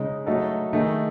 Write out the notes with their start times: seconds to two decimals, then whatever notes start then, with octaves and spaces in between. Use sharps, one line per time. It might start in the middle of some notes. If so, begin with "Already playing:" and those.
Already playing: C#3 G#3 D#4
0.26 F#3 A3 D#4 F#4 A4
0.73 D#3 A3 D#4 G#4